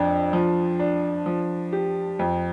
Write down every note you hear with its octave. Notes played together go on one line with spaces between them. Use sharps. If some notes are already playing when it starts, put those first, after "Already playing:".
Already playing: F2 D4
F3
D4
F3
G4
F2